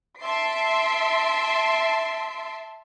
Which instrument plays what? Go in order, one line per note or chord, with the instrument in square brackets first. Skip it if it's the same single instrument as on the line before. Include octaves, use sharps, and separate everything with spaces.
[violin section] E5 A5 C6 C7 D7